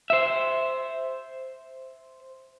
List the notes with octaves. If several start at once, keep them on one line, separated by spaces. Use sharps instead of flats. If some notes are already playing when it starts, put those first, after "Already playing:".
C5 E5